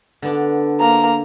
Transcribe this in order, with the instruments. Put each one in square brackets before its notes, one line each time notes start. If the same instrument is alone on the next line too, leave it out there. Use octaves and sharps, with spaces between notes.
[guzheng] D3 B3 D4
[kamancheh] A#3 A#5